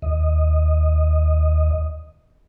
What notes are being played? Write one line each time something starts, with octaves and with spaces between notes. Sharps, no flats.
D#2 D#5